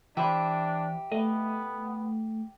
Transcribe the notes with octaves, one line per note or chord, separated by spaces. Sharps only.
E3 D4 G4 C5 E5 B5
A3 B3 D#5